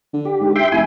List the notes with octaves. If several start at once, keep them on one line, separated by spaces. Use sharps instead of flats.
D3
G4
G#2
E5 G5 C6
F1 E4 G#5